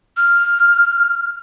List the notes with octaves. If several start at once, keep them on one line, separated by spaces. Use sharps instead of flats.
F6